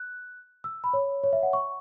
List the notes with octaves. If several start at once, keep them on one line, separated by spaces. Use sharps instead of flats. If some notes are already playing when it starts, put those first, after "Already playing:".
Already playing: F#6
E6
B5
C#5
C#5
E5
F#5
C#6